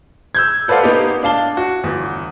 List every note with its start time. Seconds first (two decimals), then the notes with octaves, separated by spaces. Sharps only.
0.35 E6 G6 G#6
0.68 A4 B4 C5 D5 F5 F#5
0.83 A#3 B3 D#4 G4
1.23 D4 F5 A5 G7
1.57 F#4
1.83 G1 E2